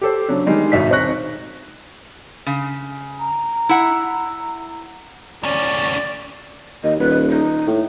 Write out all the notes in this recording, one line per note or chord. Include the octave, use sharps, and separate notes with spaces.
G4 A4 C5
C#3 F#3 D4
D3 D#3 G3 G#3 D#4
G#1 G#2 B2 D#4 E5 B6
D#1 C4 D#4 C#6 F#6 A#6
C#3
A#5
E4 F#5
D2 C#4 D5
D#2 D#5
D#1 B4
D#4
A2